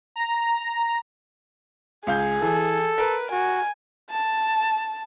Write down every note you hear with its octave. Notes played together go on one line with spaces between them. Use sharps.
A#5
C#2 G#4 F5 G6
E3 A4
A#4 B4
F#4 G#5
A5